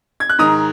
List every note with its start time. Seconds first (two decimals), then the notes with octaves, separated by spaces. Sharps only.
0.20 G#6
0.29 F#6
0.39 G#2 D#3 A#5 D#6